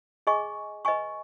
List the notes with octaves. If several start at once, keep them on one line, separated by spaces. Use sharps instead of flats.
G#4 D#5 G#5 C#6
B4 D#5 G#5 C#6